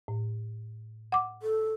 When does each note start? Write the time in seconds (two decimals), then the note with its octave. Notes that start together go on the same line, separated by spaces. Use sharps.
0.08 A2
1.12 F#5 D6
1.43 A4